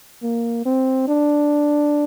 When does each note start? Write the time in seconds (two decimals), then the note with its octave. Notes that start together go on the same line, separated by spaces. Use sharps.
0.23 A#3
0.65 C4
1.08 D4